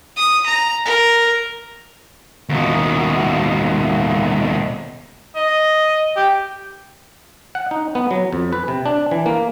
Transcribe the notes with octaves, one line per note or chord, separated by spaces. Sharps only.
D#6
A#5
A#4
D#2 B2
D#5
G4
F#5
D#4
B3
F#3
F2
B4
C3
D4
E3
A#3